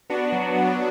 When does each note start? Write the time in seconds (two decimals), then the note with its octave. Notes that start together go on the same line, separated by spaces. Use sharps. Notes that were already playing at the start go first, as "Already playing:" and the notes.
0.10 B3 D4 F#4
0.32 F#3
0.55 B3 D4 F#4